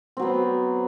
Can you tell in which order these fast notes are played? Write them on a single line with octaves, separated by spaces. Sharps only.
C4 F#3 B3